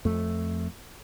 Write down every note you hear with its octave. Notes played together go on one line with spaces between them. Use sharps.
F2 A3